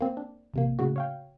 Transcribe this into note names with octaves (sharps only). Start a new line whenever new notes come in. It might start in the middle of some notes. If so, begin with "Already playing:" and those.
A#3 C4
D4
A1 C3 A#3
A2 C#3 F#4
C#5 F5 G5